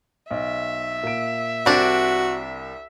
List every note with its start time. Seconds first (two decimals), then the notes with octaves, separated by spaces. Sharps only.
0.31 B1 E5
1.03 A#2 D7
1.66 C2 C4 D4 F#4